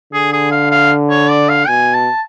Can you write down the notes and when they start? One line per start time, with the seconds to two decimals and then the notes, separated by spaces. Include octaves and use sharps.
0.13 D3 G#4
0.33 G#4
0.52 F5
0.71 F5
1.10 C#5
1.29 D5
1.49 F5
1.68 B2 G#5
1.94 A5